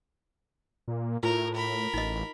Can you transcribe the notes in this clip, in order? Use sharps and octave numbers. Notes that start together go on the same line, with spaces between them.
A#2
A2 F4 A#4
A#4 B5
A1 D#4 D#5